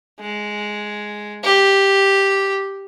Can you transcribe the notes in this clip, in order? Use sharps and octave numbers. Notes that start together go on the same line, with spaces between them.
G#3
G4